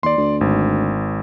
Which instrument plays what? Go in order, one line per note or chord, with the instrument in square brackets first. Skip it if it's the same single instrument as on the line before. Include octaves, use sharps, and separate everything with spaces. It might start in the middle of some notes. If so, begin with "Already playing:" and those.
[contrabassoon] D#2 [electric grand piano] D5 C6
[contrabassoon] D2
[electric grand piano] G#1